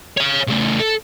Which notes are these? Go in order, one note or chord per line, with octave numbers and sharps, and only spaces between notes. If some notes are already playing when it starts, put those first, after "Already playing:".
C#5 F5
C#3 A3
A4